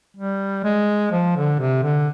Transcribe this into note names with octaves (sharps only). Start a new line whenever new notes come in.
G3
G#3
F3
D3
C3
D3